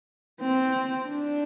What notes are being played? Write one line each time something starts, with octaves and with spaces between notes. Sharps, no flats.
C4
D4